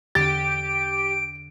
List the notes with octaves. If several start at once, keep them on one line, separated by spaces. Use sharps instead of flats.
E2 D3 G4 A6 D7